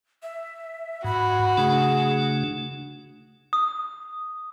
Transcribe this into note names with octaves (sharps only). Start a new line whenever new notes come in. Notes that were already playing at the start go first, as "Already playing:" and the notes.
E5
G#2 F#4 B5
C#3 A3 D4 G#4
D#6